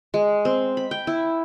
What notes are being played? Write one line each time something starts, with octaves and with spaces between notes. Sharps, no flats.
G#3
C4
B5
G5
E4